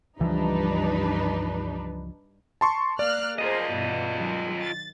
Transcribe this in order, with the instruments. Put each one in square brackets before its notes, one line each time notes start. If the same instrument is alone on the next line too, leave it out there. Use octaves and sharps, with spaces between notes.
[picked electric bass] C#2 E3 F3 [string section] G2 [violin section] D4 D#4 B4
[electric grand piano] A5 C6 C#6
[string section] A#3 F6 F#6 [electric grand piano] D5
[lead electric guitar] F4 D#5 [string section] G#4 A#4 C5
[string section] G2 B2 E3
D#3 F#3 G#3
A6